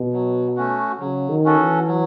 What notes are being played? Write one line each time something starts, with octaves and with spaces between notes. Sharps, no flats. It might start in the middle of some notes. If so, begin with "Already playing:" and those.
Already playing: B2
F#3
A3 C#4 F#4
C#3 F#3
D#3
C#4 F#4 A4
E3
F#3